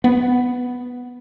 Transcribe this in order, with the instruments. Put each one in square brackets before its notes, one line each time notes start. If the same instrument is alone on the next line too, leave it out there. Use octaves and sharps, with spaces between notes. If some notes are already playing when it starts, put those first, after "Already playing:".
[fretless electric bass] B3